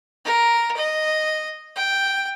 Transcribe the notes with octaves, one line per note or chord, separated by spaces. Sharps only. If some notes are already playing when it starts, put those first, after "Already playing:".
A#4
D#5
G5